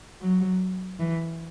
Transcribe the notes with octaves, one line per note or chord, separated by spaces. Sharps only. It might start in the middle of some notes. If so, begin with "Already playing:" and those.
F#3
E3